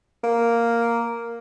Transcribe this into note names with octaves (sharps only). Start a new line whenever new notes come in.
A#3